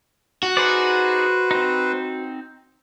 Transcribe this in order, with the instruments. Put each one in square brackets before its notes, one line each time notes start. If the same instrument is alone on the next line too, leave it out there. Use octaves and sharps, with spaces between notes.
[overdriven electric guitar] F#4
[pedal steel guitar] D#4 G#4 D5 [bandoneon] B4 C5
[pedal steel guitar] C4 D#4